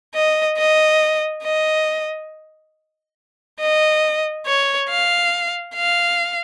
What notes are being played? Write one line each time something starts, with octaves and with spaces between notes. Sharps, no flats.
D#5
D#5
D#5
D#5
C#5
F5
F5